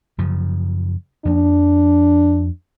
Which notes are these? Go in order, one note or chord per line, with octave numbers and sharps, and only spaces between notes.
F#2 C#3 F3
F2 F3 A#3 D4